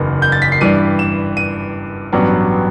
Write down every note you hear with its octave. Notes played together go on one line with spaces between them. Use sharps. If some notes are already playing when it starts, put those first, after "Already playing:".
Already playing: F#1 E2 D#3 B3
G6
A6
B6
C7
G2 E3 G3 D#7
E7
D#7
A1 G2 F#3 B3